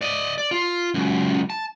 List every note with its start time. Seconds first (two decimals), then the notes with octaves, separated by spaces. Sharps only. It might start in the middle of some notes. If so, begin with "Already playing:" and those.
0.01 D5 D#5
0.38 D5
0.51 F4
0.94 C#2 F#2
1.50 A5